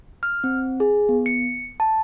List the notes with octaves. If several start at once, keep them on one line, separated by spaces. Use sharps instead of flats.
F6
C4
G#4
B3
C#7
A5